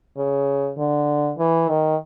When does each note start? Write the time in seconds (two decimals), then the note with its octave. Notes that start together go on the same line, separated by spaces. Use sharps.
0.17 C#3
0.77 D3
1.38 E3
1.68 D#3